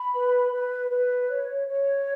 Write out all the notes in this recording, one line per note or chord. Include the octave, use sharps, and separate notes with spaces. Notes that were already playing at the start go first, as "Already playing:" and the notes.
Already playing: B5
B4
B4
B4
C#5
C#5